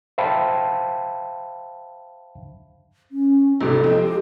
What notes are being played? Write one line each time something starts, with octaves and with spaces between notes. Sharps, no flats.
C5 E5 F5 G5 A5 B5
C#4
A#1 G#2 C3 A4
F3 G#3 C4
G4